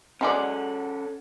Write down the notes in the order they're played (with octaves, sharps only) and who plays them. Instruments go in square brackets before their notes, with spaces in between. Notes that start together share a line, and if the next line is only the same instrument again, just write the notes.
[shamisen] F#3 G#3 D5 [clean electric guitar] C#4 A4 F#5